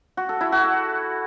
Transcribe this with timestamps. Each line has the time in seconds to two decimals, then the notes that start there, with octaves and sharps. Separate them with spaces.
0.17 F#4
0.29 A4
0.41 E4
0.52 F#4
0.64 A4